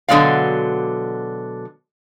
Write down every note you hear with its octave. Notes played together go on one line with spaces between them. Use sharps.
B2 D3 F#3 G#3 D5 F5